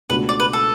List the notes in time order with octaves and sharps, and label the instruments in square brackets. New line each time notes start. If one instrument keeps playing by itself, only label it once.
[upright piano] C#2 B2 A3 D4 F#4 [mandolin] B4
[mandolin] D5
B4
A4